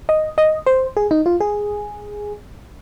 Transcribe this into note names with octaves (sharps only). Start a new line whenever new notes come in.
D#5
D#5
C5
G#4
D#4
F4
G#4